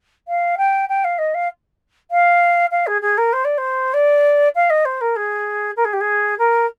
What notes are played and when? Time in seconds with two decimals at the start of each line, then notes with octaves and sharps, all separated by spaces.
0.28 F5
0.58 G5
0.89 G5
1.04 F5
1.19 D#5
1.35 F5
2.11 F5
2.71 F5
2.87 G#4
3.02 G#4
3.18 A#4
3.33 C5
3.45 D5
3.58 C5
3.94 D5
4.55 F5
4.70 D#5
4.85 C5
5.01 A#4
5.16 G#4
5.77 A#4
5.85 G#4
5.93 G4
6.01 G#4
6.39 A#4